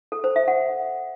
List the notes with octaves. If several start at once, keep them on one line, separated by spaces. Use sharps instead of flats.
A4
C5
E5
F#5